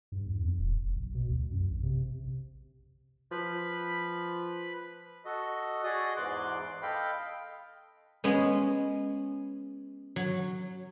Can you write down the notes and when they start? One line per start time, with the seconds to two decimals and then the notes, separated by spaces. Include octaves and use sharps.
0.12 G2
0.26 E2
0.45 F2
0.58 D#1
0.84 F#1
0.96 B1
1.15 B2
1.28 D2
1.51 F#2
1.70 A#1
1.83 C3
3.31 F3 B4 B5
5.25 F#4 A4 D#5
5.84 F#4 G#4 D5 D#5 D#6
6.17 E2 G#2 E3 C6 D6 F#6
6.82 A4 D#5 F5 G5 B5
8.24 G#3 B3 C#4
10.16 F#3